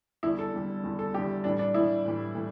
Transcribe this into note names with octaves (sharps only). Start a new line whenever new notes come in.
E2 D3 G3 E4
A4
E2 D3 G3
E2 D3 G3
A4
E2 D3 G3 G4
A2 E3 G3 D4
D4
A2 E3 G3 E4
A2 E3 G3
A2 E3